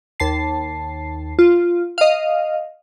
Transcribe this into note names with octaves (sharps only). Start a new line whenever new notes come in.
D#2 A5 C7
F4
D#5 F5